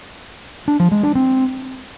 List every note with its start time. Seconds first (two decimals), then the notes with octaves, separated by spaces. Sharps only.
0.68 D4
0.80 F3
0.91 G#3
1.03 D4
1.15 C4